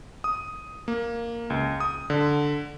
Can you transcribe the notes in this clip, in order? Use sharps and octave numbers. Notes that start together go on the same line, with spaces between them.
D#6
A#3
C#2
D#6
D3